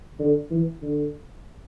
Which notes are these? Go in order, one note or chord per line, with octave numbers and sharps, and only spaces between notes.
D3
E3
D3